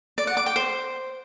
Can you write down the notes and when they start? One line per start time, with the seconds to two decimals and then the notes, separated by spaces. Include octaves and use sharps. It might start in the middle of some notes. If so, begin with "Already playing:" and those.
0.18 D5
0.27 F#5
0.37 D6
0.46 G5
0.56 C5